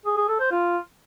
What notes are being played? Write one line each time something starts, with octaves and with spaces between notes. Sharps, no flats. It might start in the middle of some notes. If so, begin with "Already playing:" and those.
G#4
G#4
A4
C5
F4